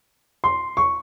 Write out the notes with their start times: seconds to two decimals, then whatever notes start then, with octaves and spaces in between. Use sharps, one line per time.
0.44 C6
0.77 C#6